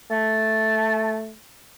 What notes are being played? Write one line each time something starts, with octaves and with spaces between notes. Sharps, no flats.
A3 A5